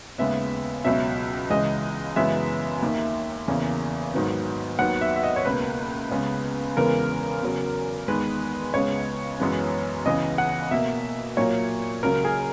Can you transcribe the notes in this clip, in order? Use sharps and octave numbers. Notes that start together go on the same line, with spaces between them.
D#2 C#3 G#3 B3 E5
C#2 B2 F#3 E5
C#2 C#3 E3 G#3 D#5
F#2 C#3 E3 G#3 B3 E5
D#2 D#3 A#3
E2 C#3 E3 A#3
G#2 D#3 F#3 B3
D#2 D#3 F#3 B3 F#5
E5
E5
D#5
C#5
C#2 B2 A#3 B4
C#2 C#3 G#3 B3
E2 C#3 E3 G#3 B3 A#4
E2 C#3 F#3
E2 D#3 G#3 B3 B4
C#2 C#3 G#3 B3 C#5
F#2 E3 G#3 B3
C#2 C#3 E3 B3 D#5
F#5
B2 A#3 E5
A#2 F#3 A#3 C#5
C#2 C#3 F#3 A#4
G#4